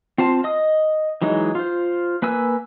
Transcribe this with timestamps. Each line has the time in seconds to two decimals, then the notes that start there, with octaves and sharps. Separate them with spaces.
0.18 C4 F4 C5 A5
0.44 D#5 D#6
1.22 E3 F#3 G#3 D#4
1.55 F4 C5
2.22 A#3 B4 G#5 E6